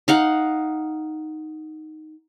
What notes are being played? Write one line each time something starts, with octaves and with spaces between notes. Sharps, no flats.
D#4 F5 F#5